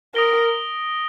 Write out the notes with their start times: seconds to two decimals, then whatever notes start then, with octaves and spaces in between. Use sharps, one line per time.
0.15 A#4 D#6 A#6 D7 G7